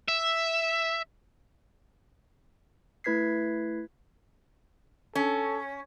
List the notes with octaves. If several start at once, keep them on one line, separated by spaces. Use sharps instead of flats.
E5
A3 E4 B4 G#6 B6 C7
C#4 A4